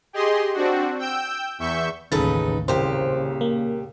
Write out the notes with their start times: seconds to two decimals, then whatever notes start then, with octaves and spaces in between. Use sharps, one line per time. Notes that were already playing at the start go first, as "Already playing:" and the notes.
0.13 G4 G#4 D#5 C6
0.54 C4 D4 F#4
0.99 G5 E6 G6
1.59 E2 E5 C#6 G6
2.12 A1 D#2 C#3 D#4 A4 B4 A6
2.68 C2 A#2 C#3 G4 C5
3.41 A#3